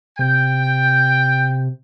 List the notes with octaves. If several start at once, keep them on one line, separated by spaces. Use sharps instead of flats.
C3 G5